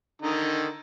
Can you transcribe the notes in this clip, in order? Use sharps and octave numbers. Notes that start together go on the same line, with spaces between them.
D3 D#3 D#4